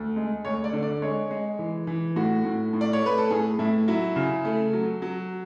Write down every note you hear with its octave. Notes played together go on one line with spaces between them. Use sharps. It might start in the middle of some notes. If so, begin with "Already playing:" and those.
Already playing: D2
G#3
D2 C#5
D5
D3
D5
G#3 C#5
G#3
E3
E3
A2 F#4
A2
A2
D5
C#5
A3 B4
A4
A2 G#4
A2 E4
F#3 E4
C#3
A3
F#3
F#3